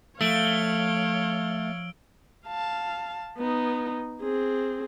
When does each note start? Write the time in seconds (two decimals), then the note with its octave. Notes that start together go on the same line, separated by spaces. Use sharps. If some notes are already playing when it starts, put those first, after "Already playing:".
0.21 F3 A3 C#5 F5 E6 D7 G7
2.47 F5 A5
3.38 B3 D#4
4.21 C4 G#4